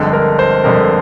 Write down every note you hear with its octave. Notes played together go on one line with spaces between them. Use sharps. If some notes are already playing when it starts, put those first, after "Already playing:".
Already playing: G1 F2 D3 G#3
A#4
C5
G1 F2 D3 G#3 A#4